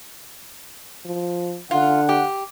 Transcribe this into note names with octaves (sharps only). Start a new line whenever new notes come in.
F3
D3 F4 F#5
G4